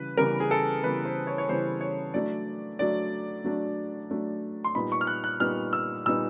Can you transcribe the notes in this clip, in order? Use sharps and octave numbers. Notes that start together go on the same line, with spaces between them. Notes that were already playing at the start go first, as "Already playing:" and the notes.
Already playing: C#3 E3 G3 B4
C#3 E3 G3 B3 A#4
G#4
A4
C#3 E3 G3 B3 B4
C5
C#5
C#5
C#3 E3 G3 B3 C5
C#5
F#3 A3 D4 D5
F#3 A3 D4 D5
F#3 A3 D4
F#3 A3 D4
C6
A#2 G3 B3 D#4 B5
C#6
F6
F#6
F#6
A#2 G3 B3 D#4 F6
E6
A#2 G3 B3 D#4 E6